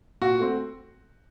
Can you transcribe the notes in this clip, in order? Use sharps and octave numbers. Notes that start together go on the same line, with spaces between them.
A#2 F#4
A3 C4